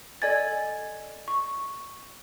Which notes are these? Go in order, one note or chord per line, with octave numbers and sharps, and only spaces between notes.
A4 D5 D#5 G#5 G#6 A6
C#6